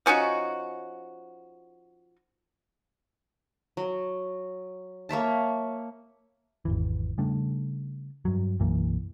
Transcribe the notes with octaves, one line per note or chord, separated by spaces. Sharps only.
F3 C#4 D#4 F#4
F#3
A#3 C#5 E5 A5
G#1 E2 E3
C#3 G3 A3 D4
G2 F#3
B1 F#2 E3 A#3